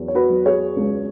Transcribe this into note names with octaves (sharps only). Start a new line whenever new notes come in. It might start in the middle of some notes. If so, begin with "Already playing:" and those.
Already playing: E2 F#3
C#5
F#4 B4
F#3
G#4 C#5
C#2